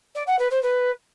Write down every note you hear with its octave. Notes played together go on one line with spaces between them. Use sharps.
D5
F#5
B4
C5
B4